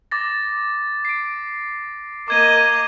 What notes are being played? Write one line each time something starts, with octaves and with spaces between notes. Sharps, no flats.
D6 A6 A#6
C7 D7
A#3 D#5 D6 G#6 D#7